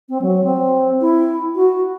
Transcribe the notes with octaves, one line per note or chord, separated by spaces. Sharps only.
C4
F#3
C4
E4
F#4